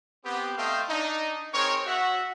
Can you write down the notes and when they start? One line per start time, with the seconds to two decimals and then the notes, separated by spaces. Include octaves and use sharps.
0.25 B3 C4 G4
0.57 A3 C4 C5 D#5 F5 G5
0.89 D4 D#4
1.53 C4 D#4 G#4 A#4 C#5
1.85 F#4 E5 F#5